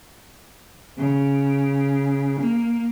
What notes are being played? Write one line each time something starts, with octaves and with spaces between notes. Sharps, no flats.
C#3
A#3